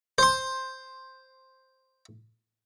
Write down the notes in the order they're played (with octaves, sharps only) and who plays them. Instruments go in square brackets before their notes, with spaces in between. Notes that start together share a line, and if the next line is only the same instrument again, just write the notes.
[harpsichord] C5 C6